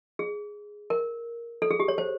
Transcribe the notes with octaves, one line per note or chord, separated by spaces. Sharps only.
G#4
A#4
A4
G#4
G4
C#5
C5